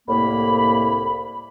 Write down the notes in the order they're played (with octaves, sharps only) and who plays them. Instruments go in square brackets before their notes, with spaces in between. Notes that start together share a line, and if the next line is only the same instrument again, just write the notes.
[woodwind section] C2 A2 A#3 [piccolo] B5